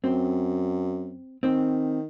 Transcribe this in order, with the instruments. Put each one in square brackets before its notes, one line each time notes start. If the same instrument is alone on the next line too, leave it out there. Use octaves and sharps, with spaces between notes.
[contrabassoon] F#2 [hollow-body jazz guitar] C4
[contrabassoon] D#3 [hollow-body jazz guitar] C4